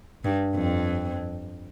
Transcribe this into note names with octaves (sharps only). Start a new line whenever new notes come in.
G2
F2